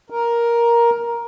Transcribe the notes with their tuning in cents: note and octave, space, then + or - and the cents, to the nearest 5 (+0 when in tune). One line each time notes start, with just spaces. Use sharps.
A#4 +10